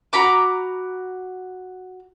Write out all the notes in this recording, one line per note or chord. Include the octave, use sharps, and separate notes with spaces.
F#4 A#5 B5 D6